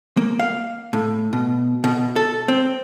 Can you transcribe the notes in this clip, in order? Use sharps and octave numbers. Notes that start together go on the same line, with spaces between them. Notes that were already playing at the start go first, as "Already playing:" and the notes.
A#3
F5
A2
B2
B2
A4
C4